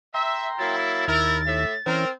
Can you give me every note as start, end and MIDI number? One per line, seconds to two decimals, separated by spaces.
0.14 0.47 76
0.14 0.76 79
0.14 0.76 82
0.14 0.76 84
0.59 1.07 54
0.59 1.07 58
0.59 1.07 64
0.59 2.13 93
1.08 1.65 39
1.08 1.40 64
1.08 1.40 70
1.47 1.74 45
1.47 1.74 76
1.86 2.05 52
1.86 2.10 60
1.86 2.05 61
1.86 2.10 70